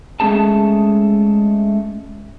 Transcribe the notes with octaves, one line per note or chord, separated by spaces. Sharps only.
G#3 A3 C#4 G#4 A5